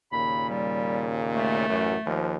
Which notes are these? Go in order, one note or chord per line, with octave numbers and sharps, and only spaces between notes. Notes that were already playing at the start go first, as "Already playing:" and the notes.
D#2 A#2 C#3 B5
G3
A3
A1 F#2
D#2 F3